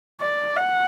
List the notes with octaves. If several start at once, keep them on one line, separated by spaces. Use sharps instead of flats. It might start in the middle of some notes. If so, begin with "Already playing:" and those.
D5
F#5